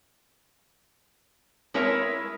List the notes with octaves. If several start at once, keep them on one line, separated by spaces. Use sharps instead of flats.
G#3 E4 A#4 B4 C#5 E5